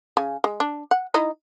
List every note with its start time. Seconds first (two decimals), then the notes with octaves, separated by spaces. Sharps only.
0.17 C#3 G#5
0.44 G#3
0.60 D4
0.91 F#5
1.14 D#4 E4 D#5